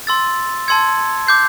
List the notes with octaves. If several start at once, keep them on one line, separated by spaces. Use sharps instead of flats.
C6 E6 A6
A5 C6 E6 G#6 C#7
D6 G6 C7